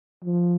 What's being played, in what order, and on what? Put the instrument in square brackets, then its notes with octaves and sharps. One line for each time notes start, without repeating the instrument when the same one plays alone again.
[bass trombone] F3